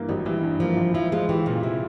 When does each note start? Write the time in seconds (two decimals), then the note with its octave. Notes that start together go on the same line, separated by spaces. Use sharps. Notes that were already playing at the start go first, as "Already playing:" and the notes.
Already playing: G2 E3 A#3
0.09 G#1 G3
0.26 E3 G3
0.43 G2
0.60 F3 A#3
0.77 G#1
0.94 F3 E4
1.12 F3 G#3
1.29 E3 G4
1.46 A#2 C#3
1.63 C3 E4